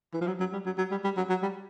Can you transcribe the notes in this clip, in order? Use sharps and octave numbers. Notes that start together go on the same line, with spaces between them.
E3
F3
F#3
F#3
G3
F#3
F#3
G3
G3
F#3
F#3
G3